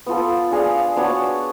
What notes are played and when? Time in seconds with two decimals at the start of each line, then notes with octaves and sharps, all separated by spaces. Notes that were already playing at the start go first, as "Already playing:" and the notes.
0.06 B3 F4 A4
0.51 D4 G#4 D5 F5
0.96 B3 D4 F#4 C#5